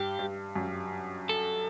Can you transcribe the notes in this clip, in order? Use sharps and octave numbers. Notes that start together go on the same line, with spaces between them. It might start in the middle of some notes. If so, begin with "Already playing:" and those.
Already playing: G2 G4
G2
F#2
A4